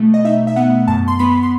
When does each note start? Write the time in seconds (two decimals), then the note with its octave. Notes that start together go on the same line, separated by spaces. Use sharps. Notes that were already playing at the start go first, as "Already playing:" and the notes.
Already playing: B2 A3
0.14 D#5
0.25 D#4 E5
0.47 E5
0.56 B3 F#5
0.88 F#2 A5
1.08 C6
1.19 B3 B5
1.43 C6